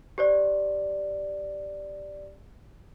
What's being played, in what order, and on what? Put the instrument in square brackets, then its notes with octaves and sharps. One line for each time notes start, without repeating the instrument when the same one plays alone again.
[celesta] G4 C5 D5